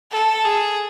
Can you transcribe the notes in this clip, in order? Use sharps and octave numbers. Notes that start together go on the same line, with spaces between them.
A4
G#4